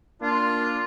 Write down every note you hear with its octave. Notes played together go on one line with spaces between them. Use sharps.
A#3 D4 F4